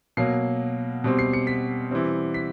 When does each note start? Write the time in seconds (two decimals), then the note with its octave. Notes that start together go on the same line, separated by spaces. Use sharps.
0.17 B2 F#3 A#3 C7
1.04 B2 G3 C4
1.19 C7
1.33 C#7
1.47 B6
1.91 E3 G3 C4
2.34 B6